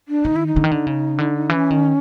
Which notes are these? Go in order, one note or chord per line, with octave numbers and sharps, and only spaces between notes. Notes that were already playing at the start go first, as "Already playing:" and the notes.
D4
D#3 D#4
E4
D#4
D3
D#3
D3
C#3
D3
E3 D4
C#4
D#3